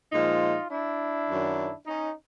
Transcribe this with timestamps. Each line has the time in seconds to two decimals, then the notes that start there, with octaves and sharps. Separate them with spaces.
0.13 A#2 F3 G#3 D#4 F4
0.70 D4 E4
1.28 F#2 D#3 F#3
1.86 C#4 D#4